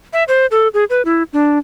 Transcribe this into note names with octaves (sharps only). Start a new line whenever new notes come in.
E5
C5
A4
G#4
B4
E4
D4